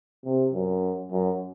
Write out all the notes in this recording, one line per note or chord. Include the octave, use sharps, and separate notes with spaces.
C3
F#2
F#2